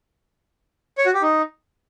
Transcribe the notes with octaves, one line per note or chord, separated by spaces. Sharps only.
C#5
F#4
G4
D#4